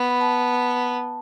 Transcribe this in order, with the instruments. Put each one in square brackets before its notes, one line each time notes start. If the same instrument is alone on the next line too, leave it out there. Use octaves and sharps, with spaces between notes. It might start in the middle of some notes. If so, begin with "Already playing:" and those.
Already playing: [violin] B3
[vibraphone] B5
A5